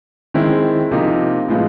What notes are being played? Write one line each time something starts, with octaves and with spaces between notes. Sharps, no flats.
D#3 G#3 C4 E4
C3 F3 A#3 D#4
A2 F3 G#3 B3